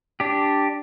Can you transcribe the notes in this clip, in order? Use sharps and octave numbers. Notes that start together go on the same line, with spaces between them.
D4 G4